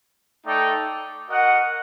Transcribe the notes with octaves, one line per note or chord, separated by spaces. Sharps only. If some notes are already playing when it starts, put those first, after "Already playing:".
A3 D#4 A4 D5 G5
F#4 A#4 D#5 F#5